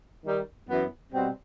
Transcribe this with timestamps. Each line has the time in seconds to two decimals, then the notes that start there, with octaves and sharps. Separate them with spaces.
0.24 D#3 G3 D#4
0.68 F#2 E3 B3
1.13 B2 G3 C4